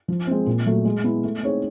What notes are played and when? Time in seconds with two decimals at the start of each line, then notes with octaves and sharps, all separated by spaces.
0.08 F3
0.27 G#3 C4
0.47 A#2
0.66 F#3 A3
0.85 G#3
1.04 B3 E4
1.24 A3
1.43 C4 D#4 G#4 C#5